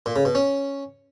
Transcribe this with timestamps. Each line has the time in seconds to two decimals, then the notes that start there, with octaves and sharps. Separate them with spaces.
0.06 A#2
0.16 C#3
0.25 B2
0.35 C#4